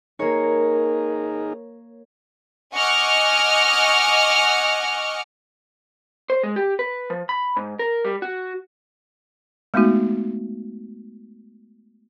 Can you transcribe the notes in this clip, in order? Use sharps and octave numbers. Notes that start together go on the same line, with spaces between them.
A#3 D#4 G#4 A#4 C#5
D#5 F#5 G#5 C#6 D6 F6
C5
G#3
G4
B4
F3
B5
G#2
A#4
G3
F#4
G#3 A3 B3 D#4 F#4